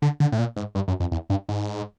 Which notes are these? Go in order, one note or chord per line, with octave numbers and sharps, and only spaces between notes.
D3
D3
A2
A#2
G#2
G2
F#2
F2
E2
G2
G#2